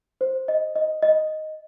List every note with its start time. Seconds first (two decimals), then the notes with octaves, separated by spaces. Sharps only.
0.21 C5
0.48 D#5
0.76 D#5
1.02 D#5